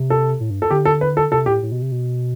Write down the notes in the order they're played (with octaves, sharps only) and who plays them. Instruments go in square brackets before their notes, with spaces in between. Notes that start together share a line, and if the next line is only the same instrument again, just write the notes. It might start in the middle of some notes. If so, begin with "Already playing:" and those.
Already playing: [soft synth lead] C3
[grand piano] A4
[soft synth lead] A2
G2
[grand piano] A4
[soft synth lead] D3 [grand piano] G4
[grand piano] A4
B4
A4
[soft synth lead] C3 [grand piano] A4
[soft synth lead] A2 [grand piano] G4
[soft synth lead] A2
B2
C3
B2